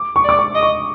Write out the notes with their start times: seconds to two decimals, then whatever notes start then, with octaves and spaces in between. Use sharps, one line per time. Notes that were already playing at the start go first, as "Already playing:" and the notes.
Already playing: D6
0.16 C#6
0.24 D5
0.29 D6
0.39 C#6
0.55 D#5
0.63 C#6